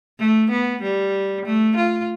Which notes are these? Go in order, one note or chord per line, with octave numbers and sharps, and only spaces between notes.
A3
B3
G3
A3
F4